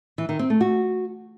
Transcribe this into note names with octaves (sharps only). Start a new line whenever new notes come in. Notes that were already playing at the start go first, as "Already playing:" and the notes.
E3
D#3
C4
A3
F#4